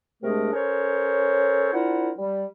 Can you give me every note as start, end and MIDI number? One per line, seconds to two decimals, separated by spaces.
0.23 0.50 48
0.23 0.50 56
0.23 0.50 57
0.23 0.50 62
0.23 0.50 68
0.23 0.50 70
0.53 1.70 61
0.53 1.70 69
0.53 1.70 70
0.53 1.70 72
0.53 1.70 73
1.73 2.10 62
1.73 2.10 64
1.73 2.10 65
1.73 2.10 70
1.73 2.10 72
1.73 2.10 78
2.18 2.45 55